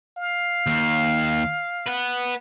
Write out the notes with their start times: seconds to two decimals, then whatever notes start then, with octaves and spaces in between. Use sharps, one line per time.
0.17 F5
0.67 D#2
1.86 B4 F#5